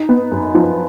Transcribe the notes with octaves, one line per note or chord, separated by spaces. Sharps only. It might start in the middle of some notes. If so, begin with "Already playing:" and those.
Already playing: D#4
B3
F#2
F3